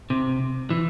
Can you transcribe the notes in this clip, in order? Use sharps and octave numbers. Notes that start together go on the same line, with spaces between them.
C3
E3